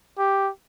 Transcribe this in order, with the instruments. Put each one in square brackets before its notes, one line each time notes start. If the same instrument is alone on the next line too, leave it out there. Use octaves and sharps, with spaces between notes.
[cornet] G4